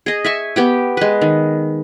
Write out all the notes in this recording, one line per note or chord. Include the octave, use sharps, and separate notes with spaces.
G#4 D#5
E5 G#5 C#6
B3 G4 G5
G#3 B4
D#3